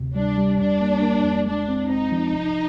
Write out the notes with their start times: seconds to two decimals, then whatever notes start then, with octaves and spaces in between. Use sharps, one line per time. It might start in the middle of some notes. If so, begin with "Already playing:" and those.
Already playing: D2 C3
0.15 G3 D4
0.38 G3
0.59 F2 D4
0.81 A#3
1.02 A#3
1.24 F2
1.46 G#3 D4
1.69 C4
1.89 C4 D#4
2.12 F3
2.33 C2